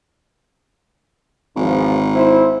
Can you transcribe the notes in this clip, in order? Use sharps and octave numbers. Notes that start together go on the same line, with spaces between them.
G#1 E2 F3
E4 C5